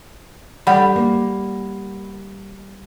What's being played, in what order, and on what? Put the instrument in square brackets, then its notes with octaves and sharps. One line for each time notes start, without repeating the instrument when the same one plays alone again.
[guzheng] G3 [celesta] F#5 B5
[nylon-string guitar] A#3